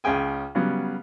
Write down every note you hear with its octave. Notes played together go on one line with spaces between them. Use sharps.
C#2 C#4 G#4 G5 G#5
C#3 F#3 G3 B3